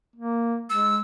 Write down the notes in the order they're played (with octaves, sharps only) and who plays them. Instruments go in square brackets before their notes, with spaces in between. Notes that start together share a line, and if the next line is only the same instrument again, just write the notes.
[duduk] A#3
[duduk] G#3 [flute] E6